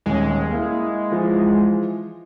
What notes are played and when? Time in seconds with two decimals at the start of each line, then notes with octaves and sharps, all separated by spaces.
0.06 D#1 G#3 C#4
0.51 A#3 E4
1.12 E3 F3